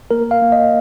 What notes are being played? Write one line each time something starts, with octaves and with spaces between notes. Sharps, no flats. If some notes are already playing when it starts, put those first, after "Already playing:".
A#3 A#4
F5
A#3
D#5